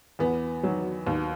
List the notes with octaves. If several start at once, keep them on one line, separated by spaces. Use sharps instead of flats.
E2 B3
D#3 F#3
D#2